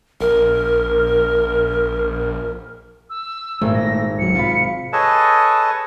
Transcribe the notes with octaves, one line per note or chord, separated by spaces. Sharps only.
A#1 A#4
E6
G#1 A#2 A3
A#6
D1 C2 F#3 C#7
C3 F4 F5 B5
G#4 A4 B4 C#5 D#5 A5